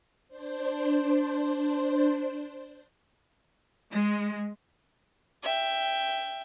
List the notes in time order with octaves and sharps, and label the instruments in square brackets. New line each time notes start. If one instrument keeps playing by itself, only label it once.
[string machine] D4 C5
[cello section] G#3
[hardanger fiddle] E5 G5